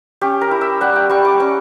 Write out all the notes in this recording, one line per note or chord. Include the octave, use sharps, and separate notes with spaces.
C#4 G4
A#4
E4
E5
G3 F#5
G5
G3 C#6
D6
C#4 C#6